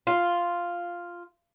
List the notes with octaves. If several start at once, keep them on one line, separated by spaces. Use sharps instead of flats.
F4